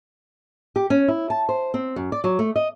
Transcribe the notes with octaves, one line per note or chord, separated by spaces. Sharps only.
G4
C#4
E4
A5
C5
C4
F#2
D5
F#3
A3
D#5